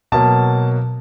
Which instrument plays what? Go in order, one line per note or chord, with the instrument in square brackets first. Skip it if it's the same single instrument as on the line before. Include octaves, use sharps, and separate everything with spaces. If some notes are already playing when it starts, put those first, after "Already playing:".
[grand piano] B2 F#3 A#3 A5